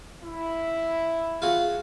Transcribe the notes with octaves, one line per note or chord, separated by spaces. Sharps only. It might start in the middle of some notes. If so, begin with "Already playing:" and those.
E4
F4 F#4 G#4